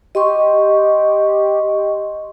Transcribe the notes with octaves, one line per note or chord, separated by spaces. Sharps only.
G4 D#5 C6 C#6